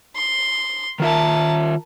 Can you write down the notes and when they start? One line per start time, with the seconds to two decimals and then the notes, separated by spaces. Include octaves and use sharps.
0.16 C6
1.00 D#3 F4 A#4 E5 A5